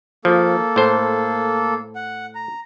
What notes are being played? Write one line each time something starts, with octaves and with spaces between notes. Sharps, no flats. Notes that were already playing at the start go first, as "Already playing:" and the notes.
F3 A#3 A4
A2 C5
F#5
A#5